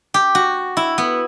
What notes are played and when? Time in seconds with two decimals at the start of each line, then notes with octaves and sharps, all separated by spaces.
0.14 G4
0.35 F#4
0.77 E4
0.98 B3